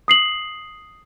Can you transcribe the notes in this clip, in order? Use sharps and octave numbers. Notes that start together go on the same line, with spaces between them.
D#6 C7 F#7